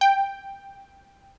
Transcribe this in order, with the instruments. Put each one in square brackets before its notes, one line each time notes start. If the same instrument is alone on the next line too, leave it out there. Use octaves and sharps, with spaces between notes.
[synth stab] G5